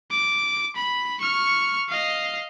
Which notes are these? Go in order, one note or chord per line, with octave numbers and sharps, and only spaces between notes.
D6
B5
C#6 F6
D#5 F5